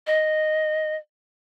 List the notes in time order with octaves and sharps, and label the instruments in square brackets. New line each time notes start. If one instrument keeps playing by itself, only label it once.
[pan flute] D#5